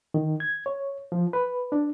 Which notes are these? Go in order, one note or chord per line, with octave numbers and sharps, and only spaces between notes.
D#3
G#6
C#5
F3
B4
D4